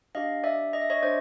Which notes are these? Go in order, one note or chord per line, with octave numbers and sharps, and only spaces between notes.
D4 G4 D#5 F5
D5 E5
D#5
E5
C#5 D#5
D4 C5 D5